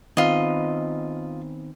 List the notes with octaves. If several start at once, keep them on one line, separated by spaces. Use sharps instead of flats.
D#3 B3 C4 F4 D#5